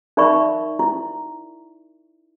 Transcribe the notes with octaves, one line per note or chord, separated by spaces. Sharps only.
D#4 A#4 D5 E5 B5 C#6
E4